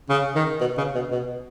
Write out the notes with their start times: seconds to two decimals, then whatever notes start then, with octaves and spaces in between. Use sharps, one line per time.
0.09 C#3
0.35 D#3
0.61 B2
0.78 C#3
0.95 B2
1.12 B2